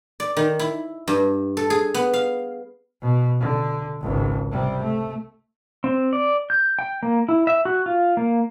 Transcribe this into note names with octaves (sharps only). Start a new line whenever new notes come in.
D5
D#3
E4
G2
A4
G#4
B3
F5
B2
D3
G#1 C#2
C3 G3
A3
C4
D5
G6
G5
A#3
E4
E5
F#4
F4
A#3